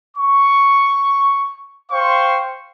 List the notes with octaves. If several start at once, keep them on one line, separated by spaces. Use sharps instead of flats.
C#6
C5 F5 G5 C6 C#6